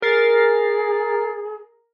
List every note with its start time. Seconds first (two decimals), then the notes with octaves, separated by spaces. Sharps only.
0.02 G#4 A#4 A6 C7